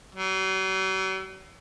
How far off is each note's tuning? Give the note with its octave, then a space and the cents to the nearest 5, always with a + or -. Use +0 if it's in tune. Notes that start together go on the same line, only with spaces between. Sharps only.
F#3 +45